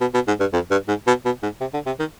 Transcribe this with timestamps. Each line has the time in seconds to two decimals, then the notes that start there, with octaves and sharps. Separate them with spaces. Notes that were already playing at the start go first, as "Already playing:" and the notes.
0.01 B2
0.14 B2
0.27 G#2
0.40 G2
0.53 F2
0.71 G2
0.88 G#2
1.07 B2
1.25 B2
1.42 G#2
1.60 C3
1.73 D3
1.86 C3
1.99 D#3